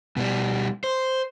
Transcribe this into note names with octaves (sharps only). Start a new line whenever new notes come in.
B2 G3
C5